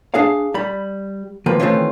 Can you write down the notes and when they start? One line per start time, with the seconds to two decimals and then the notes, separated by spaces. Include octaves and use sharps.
0.14 D4 G#4 F5
0.54 G3 B5
1.46 D#3 F3 A#3 B4
1.59 D#3 E3 A3 C4 C#4 F4